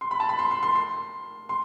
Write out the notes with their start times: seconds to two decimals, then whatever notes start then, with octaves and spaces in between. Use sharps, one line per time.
0.01 C6
0.11 B5
0.20 A5
0.29 B5
0.39 C6
0.51 C6
0.63 C6
0.75 C6
1.49 C6